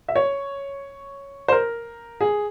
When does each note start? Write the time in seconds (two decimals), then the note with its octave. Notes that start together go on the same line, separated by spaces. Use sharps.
0.08 E5
0.16 C#5
1.48 C5
1.52 A#4
2.21 G#4